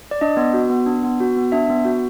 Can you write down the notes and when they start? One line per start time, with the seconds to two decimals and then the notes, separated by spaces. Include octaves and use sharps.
0.11 D5
0.21 D4 D#5
0.37 B3
0.54 F#4
0.70 B3
0.86 D4
1.04 B3
1.20 F#4
1.37 B3
1.52 D4 E5
1.70 B3
1.85 F#4